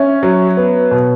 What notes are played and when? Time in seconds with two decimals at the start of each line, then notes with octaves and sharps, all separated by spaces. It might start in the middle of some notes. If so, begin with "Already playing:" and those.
Already playing: C#4 C#5 E5
0.23 F#3
0.57 B3
0.91 B2